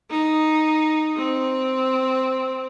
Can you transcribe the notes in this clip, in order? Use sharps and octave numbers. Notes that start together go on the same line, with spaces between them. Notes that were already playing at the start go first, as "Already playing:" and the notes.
D#4
C4